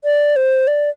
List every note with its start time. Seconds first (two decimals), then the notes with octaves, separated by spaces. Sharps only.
0.04 D5
0.36 C5
0.67 D5